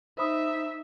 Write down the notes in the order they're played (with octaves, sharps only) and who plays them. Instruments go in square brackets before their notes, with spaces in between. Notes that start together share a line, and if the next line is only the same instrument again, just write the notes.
[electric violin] D#4 E5 [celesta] C5 B5 D#6